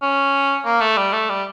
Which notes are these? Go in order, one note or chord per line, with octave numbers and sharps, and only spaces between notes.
C#4
A#3
A3
G3
A3
G3